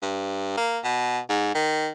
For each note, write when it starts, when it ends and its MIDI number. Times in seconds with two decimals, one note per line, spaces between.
0.03 0.53 43
0.57 0.79 58
0.84 1.19 47
1.29 1.53 44
1.55 1.89 51